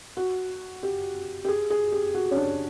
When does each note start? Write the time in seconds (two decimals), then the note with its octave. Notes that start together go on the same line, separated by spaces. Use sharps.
0.17 F#4
0.83 G4
1.45 G4
1.48 G#4
1.70 G#4
1.92 G4
2.14 F#4
2.31 C#4
2.36 D4